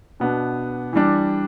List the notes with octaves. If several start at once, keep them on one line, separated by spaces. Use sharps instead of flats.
B2 B3 D4
E3 G3 D4